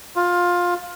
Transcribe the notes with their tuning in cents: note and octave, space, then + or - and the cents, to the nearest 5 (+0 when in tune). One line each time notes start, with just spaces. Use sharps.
F4 +15